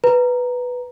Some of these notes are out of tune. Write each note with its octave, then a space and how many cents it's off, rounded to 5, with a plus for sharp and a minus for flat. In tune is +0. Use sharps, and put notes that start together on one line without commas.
B4 +0 A#5 +0